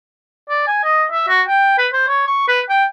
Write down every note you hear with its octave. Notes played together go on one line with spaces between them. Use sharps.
D5
G#5
D#5
E5
F#4
G5
B4
C5
C#5
C#6
B4
G5